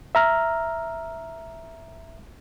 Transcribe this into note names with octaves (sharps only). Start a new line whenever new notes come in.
E5 A#5 F6